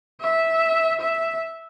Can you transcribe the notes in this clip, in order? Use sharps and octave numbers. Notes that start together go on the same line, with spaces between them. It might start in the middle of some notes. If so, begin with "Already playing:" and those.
E5
E5